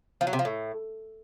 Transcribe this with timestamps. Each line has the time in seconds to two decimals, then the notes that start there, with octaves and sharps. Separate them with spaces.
0.21 F3
0.27 F#3
0.33 C3
0.39 F3
0.45 A2